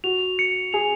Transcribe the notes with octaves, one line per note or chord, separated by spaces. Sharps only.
F#4 F7
C#7
G#4 F7